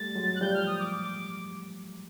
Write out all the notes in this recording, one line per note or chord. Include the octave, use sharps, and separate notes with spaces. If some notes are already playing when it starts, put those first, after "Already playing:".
Already playing: G3 A3 A6
F#3 G#3
F#6
F3 G3 G6
F6
D#6
D6
D6